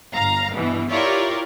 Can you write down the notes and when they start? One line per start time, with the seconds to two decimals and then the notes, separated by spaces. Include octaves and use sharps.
0.14 G1 F5 A#5
0.52 G2 B2 E3
0.91 E4 F4 G4 A#4 C#5 D5